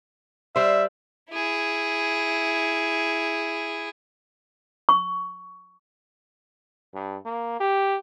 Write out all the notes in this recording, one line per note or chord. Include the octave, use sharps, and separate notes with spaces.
G3 C5 E5
E4 G#4
C#6
G2
A#3
G4